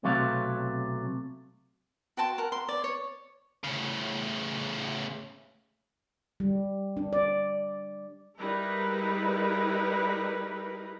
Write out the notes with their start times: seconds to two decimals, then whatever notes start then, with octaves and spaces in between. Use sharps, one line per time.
0.03 B1 C3 F#3 A3 F5
2.17 F#4 G5 A5 C6
2.38 A#4 F#5
2.52 C6
2.69 D5
2.84 C#5
3.64 A2 C#3
6.40 G3
6.97 D4
7.13 D5
8.39 G3 G#3 D#4 E4 A#4 B4